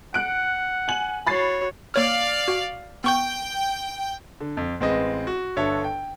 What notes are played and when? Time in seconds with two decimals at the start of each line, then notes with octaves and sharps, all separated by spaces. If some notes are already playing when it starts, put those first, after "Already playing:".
0.14 F#5 F#6 D7
0.88 G#5 F#7
1.27 F#4 C#5 B5 A6 C7
1.94 A#3 C#5 D5 F5 F6
2.48 F#4
3.04 B3 G5 C#6 G6
4.41 D3
4.57 F2
4.80 A1 G#3 C4 B4 D#5
5.27 F#4
5.56 G1 D3 A4 C#5 E5
5.84 G5